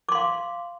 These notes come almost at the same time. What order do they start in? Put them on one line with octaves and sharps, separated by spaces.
D6 C6 F5